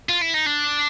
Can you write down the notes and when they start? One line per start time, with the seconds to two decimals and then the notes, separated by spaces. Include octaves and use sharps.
0.09 F4
0.22 E4
0.34 D#4
0.46 D4